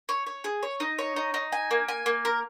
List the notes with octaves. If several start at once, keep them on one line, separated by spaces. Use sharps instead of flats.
C#5
C#5
G#4
C#5
D#4
C#5
D#4
D#4
G#5
A#3
G#5
A#3
A#4